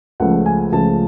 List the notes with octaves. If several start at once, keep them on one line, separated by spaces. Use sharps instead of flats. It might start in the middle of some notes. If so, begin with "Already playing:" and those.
C#2 C#3 F3 A3 F#5
G#5
C#2 C#3 F3 A3 A5